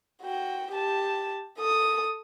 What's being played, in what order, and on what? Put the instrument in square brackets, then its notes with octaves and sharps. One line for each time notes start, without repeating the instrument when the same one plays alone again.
[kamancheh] F#4 G5
G4 A5
A4 D#6